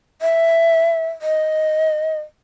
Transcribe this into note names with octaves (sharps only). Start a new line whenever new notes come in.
E5
D#5